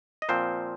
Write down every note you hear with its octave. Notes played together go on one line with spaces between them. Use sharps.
D#5
A#2 F3 C4 C5